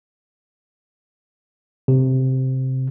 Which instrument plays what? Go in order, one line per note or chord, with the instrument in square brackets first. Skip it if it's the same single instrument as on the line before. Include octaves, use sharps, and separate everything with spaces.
[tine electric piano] C3